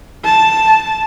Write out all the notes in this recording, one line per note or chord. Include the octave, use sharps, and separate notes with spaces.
A5